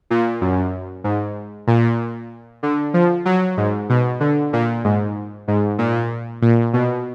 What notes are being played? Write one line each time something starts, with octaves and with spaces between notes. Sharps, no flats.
A#2
F#2
G#2
A#2
D3
F3
F#3
G#2
B2
D3
A#2
G#2
G#2
A#2
A#2
B2